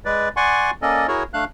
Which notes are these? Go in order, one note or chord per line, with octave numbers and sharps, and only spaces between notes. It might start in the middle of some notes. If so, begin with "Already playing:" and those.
G#3 B4 D5
D5 F#5 G#5 C6 C#6
A#3 C#4 A4 D5 D#5
E4 F#4 G#4 A#4 C#5
A3 D4 F5 F#6